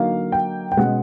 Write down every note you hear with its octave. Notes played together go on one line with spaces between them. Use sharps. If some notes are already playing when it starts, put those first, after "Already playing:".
Already playing: D3 F#3 A#3 D#4 F5
G5
G5
B2 G#3 C#4 F#5